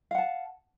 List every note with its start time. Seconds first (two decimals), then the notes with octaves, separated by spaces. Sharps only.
0.11 F5
0.15 F#5
0.18 A5